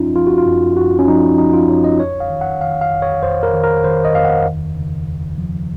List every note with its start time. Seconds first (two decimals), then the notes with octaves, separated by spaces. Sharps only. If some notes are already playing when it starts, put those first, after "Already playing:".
Already playing: F#2 F3 C#4 D#4 F4
0.15 F3 F4
0.27 F#4
0.38 F4
0.46 F#2
0.76 F#2 F#4
0.99 C#4
1.08 F3 D#4
1.38 F3 D#4
1.53 F4
1.69 F#2 C#5
1.84 D#5
2.00 F2 C#5
2.20 F5
2.30 D#3
2.41 F#5
2.61 D#3 F5
2.81 F5
2.91 F2
3.02 C#5
3.23 F2 C5
3.43 A#4
3.53 D#3
3.64 A#4
3.84 D#3 C5
4.05 D#5
4.15 F2 F5
4.25 F#5
4.46 D#2
4.77 C#3
5.08 D#2
5.38 F3